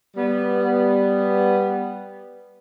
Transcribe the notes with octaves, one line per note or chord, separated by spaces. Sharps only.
G3 B3